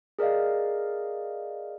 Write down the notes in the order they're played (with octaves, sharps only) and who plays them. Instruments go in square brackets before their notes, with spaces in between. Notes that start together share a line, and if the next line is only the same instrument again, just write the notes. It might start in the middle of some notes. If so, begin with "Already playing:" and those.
[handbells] G#4 A#4 D5 D#5 F5